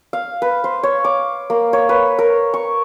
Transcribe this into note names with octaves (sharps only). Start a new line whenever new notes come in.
F5
B4
C5
C#5
D6
A#3
C#5
B4
A#4
C#6